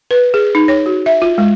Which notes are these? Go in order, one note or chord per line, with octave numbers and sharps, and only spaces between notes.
B4
G#4
D#4
C#5
F#4
E5
F4
G#3